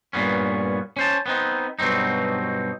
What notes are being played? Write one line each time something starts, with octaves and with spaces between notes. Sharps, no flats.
G2 A#2 B3 C#4
C#4 C5 A5
B3 C4 D#4
G2 B2 F#3 C4 D#4